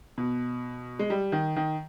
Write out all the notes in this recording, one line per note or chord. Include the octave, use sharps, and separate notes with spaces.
B2
G#3
G3
D#3
D#3